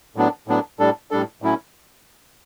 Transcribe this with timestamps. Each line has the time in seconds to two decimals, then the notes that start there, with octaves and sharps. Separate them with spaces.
0.16 A2 F#3 B3 D4
0.47 A2 F#3 B3 D4
0.79 A2 G3 D4 A4
1.11 A2 G3 D4 A4
1.42 A2 F#3 C#4 E4